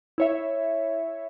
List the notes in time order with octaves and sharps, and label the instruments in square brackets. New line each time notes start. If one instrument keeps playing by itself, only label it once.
[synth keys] E4 C#5 E5